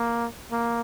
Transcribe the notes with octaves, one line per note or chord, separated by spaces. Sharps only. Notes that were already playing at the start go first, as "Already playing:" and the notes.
Already playing: A#3
A#3